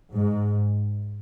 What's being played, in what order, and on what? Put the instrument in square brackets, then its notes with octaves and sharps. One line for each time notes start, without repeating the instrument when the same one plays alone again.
[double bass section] G#2